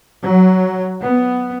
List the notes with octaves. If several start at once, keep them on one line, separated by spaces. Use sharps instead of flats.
F#3
B3